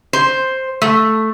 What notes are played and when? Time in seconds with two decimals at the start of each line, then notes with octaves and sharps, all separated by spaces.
0.13 C5
0.82 A3